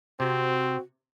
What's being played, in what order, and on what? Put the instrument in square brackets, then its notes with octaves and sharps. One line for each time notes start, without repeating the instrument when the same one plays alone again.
[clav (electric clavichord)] C3 [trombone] C4 [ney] F#4